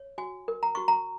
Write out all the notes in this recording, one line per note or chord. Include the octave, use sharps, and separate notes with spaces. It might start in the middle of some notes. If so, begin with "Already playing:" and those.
Already playing: C#5
F#4 G#5
A#4
A#5
F#4 C#6
A#5